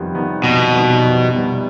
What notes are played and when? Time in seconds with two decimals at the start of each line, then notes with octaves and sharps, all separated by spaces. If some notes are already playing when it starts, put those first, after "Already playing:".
Already playing: F2 C3 D#3 G3 B3
0.14 C3 D#3 G3 B3
0.43 F2 B2
0.74 C3 D#3 G3 B3
1.03 F2
1.33 C3 D#3 G3 B3